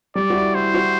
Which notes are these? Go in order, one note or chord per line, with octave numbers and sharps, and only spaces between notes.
G3 D5
F#4
E4
E4 C5
F#4